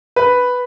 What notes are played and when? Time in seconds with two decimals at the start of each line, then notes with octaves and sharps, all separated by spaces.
0.16 B4